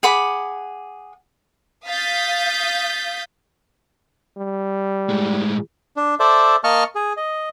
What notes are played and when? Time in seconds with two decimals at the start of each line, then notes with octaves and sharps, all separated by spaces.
0.03 G#4 F#5 B5 D6
1.86 F5 D#6 G6 A6 B6
4.37 G3
5.10 A2 G#3
5.97 D4
6.20 A4 C5 D5 E5
6.64 A#3 D#5 A5 C#6 F6
6.95 G#4
7.17 D#5